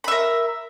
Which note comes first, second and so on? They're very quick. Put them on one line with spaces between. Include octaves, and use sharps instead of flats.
B5 E5 A#4